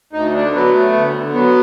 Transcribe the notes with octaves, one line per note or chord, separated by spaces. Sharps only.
D2 D#4
D3 D4
F#3 B3
A3
D2
D3
F#3 B3